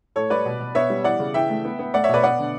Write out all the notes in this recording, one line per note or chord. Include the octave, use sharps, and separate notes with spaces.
A2 A4 C#5
G3 B4 D5
B2
B2
B3 C#5 E5
G3
E3 D5 F#5
C#3
E3 E5 G5
A3
B3
B3
A3 D5 F#5
C#5 E5
B2 B4 D5
B3 D5 F#5
D3